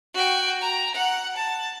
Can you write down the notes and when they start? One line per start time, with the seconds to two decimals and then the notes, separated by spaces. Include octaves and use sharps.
0.14 F#4 G5
0.61 A#5
0.95 F#5
1.36 A5